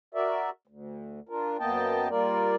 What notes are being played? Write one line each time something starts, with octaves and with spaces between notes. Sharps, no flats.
F#4 A#4 D5 E5
D2
D4 F4 A#4
F#2 A#3 B3 D#5 G5 A5
G3 A#3 F4 A#4 D5